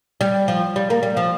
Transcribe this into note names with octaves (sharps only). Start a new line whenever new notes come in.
G3
F3
G3
A#3
G3
F3